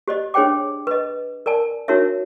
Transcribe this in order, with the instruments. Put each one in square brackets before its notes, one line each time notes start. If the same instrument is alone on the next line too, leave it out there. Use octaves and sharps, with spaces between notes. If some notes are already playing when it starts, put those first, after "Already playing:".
[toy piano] G4 C5 D5 D#5
D4 G#4 C5 C#5 G5 D6
B4 D#5
A#4 D5 G#5 A5
D4 D#4 F#4 A#4 C#5 E5